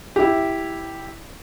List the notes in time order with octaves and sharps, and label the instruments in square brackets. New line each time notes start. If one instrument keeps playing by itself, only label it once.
[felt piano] E4 G4